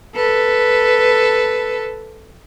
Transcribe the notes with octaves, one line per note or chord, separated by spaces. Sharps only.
A4 B4